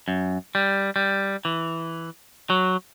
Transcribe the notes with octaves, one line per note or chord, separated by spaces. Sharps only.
F#2
G3
G3
E3
F#3